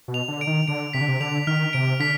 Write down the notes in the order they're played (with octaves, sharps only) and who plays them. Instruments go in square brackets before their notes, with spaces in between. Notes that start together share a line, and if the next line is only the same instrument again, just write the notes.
[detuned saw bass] B2
[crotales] F7
[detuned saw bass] D3
[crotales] D7
[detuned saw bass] D#3
[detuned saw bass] D3 [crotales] D7
[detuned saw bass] C3 [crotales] B6
[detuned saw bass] D3
C3
[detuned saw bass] D3 [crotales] F7
[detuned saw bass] D#3 [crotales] F6
[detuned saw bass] C3 [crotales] D7
[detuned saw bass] D3 [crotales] B6